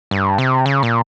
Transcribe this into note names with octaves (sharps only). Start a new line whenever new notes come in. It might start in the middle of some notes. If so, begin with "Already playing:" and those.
G2
C3
C#3
A#2